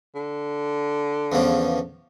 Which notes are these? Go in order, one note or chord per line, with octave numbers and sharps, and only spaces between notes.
D3
E2 C#3 F3